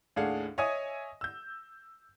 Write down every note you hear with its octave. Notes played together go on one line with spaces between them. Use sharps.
D#2 A2 D4 G#4 F5 F#5
C#5 D#5 E5 G#5 D#6
E6 G6